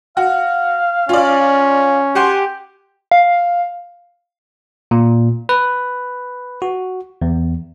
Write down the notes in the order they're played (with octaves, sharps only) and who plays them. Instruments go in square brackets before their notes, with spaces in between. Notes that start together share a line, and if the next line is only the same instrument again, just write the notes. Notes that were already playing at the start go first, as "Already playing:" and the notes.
[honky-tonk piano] F#4 [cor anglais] F5
[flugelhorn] C#4 [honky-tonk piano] F4 D5
[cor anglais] G4 [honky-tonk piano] F#5 G#5 C6
[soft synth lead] F5
[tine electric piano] A#2
B4
F#4
E2